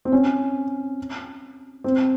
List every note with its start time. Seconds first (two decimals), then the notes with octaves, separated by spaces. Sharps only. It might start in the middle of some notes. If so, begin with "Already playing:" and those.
0.05 C4
0.12 C#4
1.84 C4